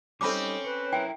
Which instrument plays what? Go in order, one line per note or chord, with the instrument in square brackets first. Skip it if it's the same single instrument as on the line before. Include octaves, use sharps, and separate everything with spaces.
[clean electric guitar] G3 D#4 [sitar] C4 C#4 [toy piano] A4 B5 D6
[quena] B4 [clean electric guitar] C#5
[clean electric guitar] E4 A#4 [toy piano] G5